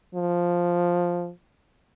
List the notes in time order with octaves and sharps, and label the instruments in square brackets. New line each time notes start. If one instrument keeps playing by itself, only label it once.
[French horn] F3